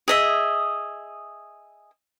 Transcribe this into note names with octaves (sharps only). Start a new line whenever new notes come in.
G#4 D#5 E5